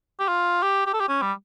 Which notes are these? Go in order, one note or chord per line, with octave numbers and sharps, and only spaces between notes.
G4
F4
G4
G4
A4
G4
C#4
G3